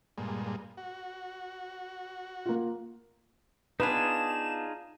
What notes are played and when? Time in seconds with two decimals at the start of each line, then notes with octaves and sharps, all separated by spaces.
0.18 G2 A#2 G#3
0.77 F#4
2.46 A#3 F4
3.80 B3 D4 D#4 F4 G#4 B4 E7